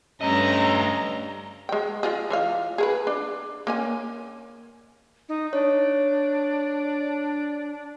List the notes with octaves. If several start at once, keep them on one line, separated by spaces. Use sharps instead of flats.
G2 A3 C#4 D#5 A#5
G#3 G5
G#3 F4 G#4
E3 F4 F5
G#4 A#4 B4
D4
A#3 C#4 G#5
D#4
D4 C#5